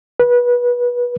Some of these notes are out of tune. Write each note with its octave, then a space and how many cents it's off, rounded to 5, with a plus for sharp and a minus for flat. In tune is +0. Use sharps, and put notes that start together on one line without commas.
B4 -25